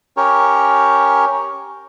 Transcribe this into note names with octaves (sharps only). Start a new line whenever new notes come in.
C#4 G4 A#4 C#5